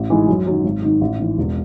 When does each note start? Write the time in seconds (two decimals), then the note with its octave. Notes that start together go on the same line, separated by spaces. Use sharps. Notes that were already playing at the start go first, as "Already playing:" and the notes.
Already playing: A1
0.10 G#2 E3 G#3
0.28 F#2
0.47 D#3 F#3
0.64 G#1
0.82 G#2 D#3
1.01 A1
1.19 G#2 E3
1.38 E1